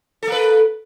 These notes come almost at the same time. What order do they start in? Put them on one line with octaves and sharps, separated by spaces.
A4 A#3 B4